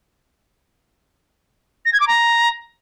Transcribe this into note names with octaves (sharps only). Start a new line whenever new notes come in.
A#6
G#6
D6
A#5